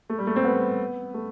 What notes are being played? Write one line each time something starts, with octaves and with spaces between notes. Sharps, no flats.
A3
G3
A3
C4
B3
A3